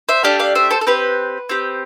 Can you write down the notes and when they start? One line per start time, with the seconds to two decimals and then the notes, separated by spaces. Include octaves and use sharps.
0.09 C5 E5
0.23 A3 D4 G4 F5 A5
0.39 D5 F5
0.55 C5 E5
0.71 A4 C5
0.81 A4
0.87 C4 G4 B4
1.49 C4 G4